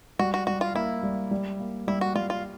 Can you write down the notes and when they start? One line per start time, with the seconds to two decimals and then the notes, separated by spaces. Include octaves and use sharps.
0.19 G3 F#4
0.34 F#4
0.47 G3 F#4
0.61 F4
0.75 A#3 E4
1.03 G3
1.31 G3
1.60 A#3
1.88 G3 E4
2.01 F#4
2.15 G3 F4
2.30 F4